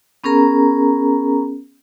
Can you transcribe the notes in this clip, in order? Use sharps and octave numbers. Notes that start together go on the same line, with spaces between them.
B3 C#4 G#4 A#4 A#5